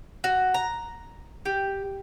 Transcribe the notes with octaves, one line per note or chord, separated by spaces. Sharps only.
F#4
A#5
G4